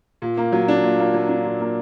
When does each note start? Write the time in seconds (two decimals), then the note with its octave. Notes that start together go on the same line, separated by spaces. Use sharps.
0.22 A#2
0.37 A#3
0.52 F#3
0.68 D4
0.83 A#2
0.99 A#3
1.14 F#3
1.29 D4
1.45 A#2
1.60 A#3